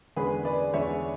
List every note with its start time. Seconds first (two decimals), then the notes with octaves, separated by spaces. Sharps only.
0.16 E2 D3 G#3 C#4 G#4 B4
0.45 B4 D5
0.74 E2 D3 G#3 C#4 C#5 E5